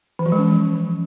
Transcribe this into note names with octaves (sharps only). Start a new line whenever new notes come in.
E3
F3
G#3
C#4